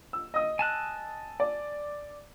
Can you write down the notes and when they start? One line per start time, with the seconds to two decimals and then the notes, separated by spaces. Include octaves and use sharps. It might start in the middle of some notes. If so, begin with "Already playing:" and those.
0.13 E6
0.34 D#5 D#6
0.59 G#5 A5 F#6
1.40 D5